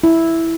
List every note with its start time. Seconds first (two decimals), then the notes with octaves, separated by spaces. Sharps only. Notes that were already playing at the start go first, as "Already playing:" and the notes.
0.04 E4